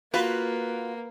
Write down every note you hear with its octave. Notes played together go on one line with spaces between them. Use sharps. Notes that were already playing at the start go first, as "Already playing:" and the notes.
A#3 F4 F#4 B4